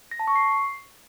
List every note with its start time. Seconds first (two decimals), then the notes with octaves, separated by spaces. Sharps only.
0.11 A#6
0.20 A5
0.28 C#6
0.36 C7